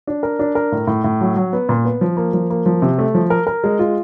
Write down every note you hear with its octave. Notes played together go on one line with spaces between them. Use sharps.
D4
A#4
D4
A#4
A2
A2
A2
F#3
F#3
B3
A#2
B3
F3
A#3
F3
A#3
F3
C3
A3
F3
A#4
A#4
G#3
F4